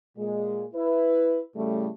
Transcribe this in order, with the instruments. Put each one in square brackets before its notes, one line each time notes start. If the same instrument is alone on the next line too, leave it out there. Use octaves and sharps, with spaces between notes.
[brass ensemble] A#2 G#3
E4 B4
A2 C#3 G3 A3